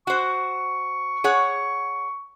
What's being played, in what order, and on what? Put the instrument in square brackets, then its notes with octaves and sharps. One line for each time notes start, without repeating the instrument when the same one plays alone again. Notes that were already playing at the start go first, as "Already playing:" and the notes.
[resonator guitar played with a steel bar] F#4 C5 [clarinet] C#6
[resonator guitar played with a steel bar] G#4 C#5 F#5